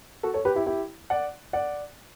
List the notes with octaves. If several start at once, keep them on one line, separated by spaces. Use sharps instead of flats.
F#4 A4
A4 C#5
G4 B4
E4 G4
E4 G4
D5 F#5
D5 F#5